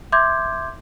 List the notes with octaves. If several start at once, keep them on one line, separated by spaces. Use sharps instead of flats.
E5 C6 D6 G6 G#6